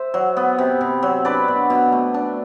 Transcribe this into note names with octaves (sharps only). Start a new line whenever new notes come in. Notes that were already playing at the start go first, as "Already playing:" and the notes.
Already playing: C5 E5
F#3
B3
C3
C3
F#3
D4 B4 D5
B2
B2
A3
D4